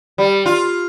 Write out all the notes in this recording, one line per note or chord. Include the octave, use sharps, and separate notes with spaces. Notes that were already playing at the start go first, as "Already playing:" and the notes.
G3
F4